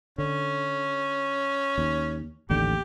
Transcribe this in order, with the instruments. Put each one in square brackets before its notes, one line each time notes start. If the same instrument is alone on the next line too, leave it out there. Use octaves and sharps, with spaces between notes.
[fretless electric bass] D3 [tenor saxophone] C#4
[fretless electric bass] D#2
[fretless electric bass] A1 D#2 D3 [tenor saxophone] G4